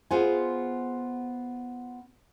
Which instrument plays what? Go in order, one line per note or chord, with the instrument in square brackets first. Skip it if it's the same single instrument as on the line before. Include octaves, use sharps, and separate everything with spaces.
[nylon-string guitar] B3 F4 G#4 C5 F#5 G#5